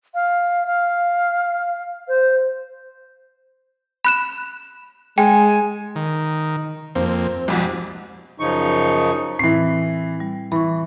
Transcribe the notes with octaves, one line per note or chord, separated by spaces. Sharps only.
F5
F5
C5
B5 F#6 E7
G#3 G5 G#5
D#3
F2 A#3 C4
B1 F2 G#2 G3
F#2 C#3 F3 D#4 C#6
A2 E3 C4 C7
G3
E3 B5 C#6